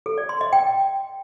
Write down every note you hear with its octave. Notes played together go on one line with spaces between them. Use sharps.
A4
D5
C6
D#5
G5